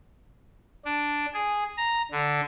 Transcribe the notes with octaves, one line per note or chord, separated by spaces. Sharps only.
D4
G#4
A#5
D3